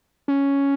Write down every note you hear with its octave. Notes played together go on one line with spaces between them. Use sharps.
C#4